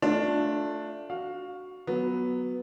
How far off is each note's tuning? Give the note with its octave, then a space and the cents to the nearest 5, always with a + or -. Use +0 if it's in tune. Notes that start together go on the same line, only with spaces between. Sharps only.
A3 +0 D4 +0 F4 +20
F#4 +0 F5 +15
F#3 +0 B3 +0